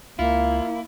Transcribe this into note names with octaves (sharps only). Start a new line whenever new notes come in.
C#2 A#3 E4 F4